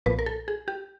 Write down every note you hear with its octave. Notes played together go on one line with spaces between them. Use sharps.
B1 A#2 F3 B4
A#4
A4
G#4
G4